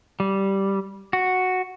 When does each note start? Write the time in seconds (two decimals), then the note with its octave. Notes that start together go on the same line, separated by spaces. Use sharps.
0.20 G3
1.13 F#4